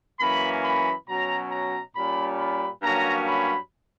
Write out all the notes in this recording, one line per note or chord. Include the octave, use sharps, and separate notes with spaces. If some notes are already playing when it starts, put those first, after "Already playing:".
F#2 E3 A#3 C#4 B5
B5
B2 F#3 C#4 A#5
A#5
A#2 G3 C#4 B5
B5
G2 F#3 A#3 C#4 A#5
B5